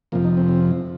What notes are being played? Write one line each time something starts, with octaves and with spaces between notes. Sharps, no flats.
F2 C3 F3 A#3
D#4
C4
C4